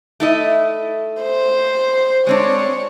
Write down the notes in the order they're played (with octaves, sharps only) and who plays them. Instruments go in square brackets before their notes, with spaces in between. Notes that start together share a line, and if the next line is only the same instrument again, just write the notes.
[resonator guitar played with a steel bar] A3 E4 D#5
[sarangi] C5
[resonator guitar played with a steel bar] G#3 C4 D4 [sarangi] C#5